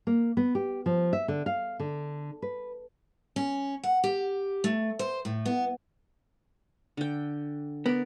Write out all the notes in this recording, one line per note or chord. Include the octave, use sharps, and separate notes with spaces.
A#3
B3
G4
F3
E5
D3
F5
D3
B4
C#4
F#5
G4
A3
C5
A2
B3
D3 G5
B3 A#4 D5